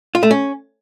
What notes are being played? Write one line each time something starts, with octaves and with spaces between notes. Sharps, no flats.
F4
A3
C#4